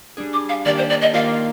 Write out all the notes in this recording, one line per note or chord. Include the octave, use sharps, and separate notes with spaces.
G3 D4 G#4
D6
F5
D#3 A#3 D4 G4 D5
C5
D5
D#5
D#3 A#3 F4 A#4 D5 F5